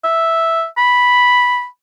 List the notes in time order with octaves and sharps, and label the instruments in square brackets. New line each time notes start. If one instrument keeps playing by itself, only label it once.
[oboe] E5
B5